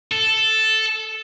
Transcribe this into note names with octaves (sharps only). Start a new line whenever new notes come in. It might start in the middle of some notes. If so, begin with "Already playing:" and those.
A4